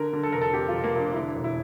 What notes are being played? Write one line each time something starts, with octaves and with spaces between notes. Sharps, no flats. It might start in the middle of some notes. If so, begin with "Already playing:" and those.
Already playing: D3 A#4
D3
A4
F1 A#4
A4
F2 G4
F4
F1
A#3
F1
D4
D3 E4
E1
E4